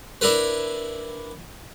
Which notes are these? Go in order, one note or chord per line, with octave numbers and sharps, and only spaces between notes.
D4 E4 A#4 B4